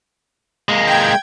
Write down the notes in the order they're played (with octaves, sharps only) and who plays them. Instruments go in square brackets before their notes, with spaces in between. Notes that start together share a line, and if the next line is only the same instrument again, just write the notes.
[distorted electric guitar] G#3 A#3
[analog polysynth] G5 G#6